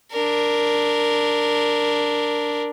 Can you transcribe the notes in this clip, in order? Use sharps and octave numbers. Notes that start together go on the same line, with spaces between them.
D4 A#4